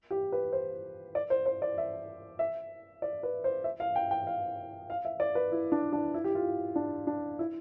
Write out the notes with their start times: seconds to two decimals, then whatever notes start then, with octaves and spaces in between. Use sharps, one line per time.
0.10 G4
0.32 B4
0.53 C5
1.15 D5
1.30 C5
1.46 C5
1.62 D5
1.78 E5
2.39 E5
3.02 D5
3.23 B4
3.44 C5
3.64 E5
3.80 F5
3.95 G5
4.11 G5
4.27 F5
4.90 F5
5.05 E5
5.20 D5
5.35 B4
5.52 E4
5.72 D4
5.93 D4
6.14 E4
6.24 G4
6.35 F4
6.76 D4
7.07 D4
7.39 E4